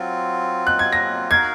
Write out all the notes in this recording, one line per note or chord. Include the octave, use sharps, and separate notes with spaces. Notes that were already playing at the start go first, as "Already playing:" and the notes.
Already playing: F#3 C4 F4
F#6
G#6
A#6
D#4 F#4 A#4 F5 G#6